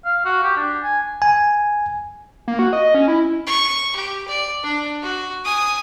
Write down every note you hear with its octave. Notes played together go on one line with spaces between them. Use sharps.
F5
F#4
G4
D4
G#5
G#5
A#3
F#4
D#5
C#4
E4
C#6
G4
D5
D4
F#4
G#5 D#6